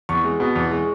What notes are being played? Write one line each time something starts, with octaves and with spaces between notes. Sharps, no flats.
E2 C#6
G#3
B2
E2
G#3